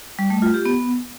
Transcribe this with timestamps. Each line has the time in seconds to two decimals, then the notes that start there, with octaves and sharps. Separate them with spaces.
0.19 G3
0.30 A3
0.42 F4
0.54 G4
0.65 B3